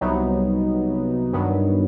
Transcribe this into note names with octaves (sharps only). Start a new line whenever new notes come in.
C2 C3 F#3 B3 D#4
G2 D#3 F#3 B3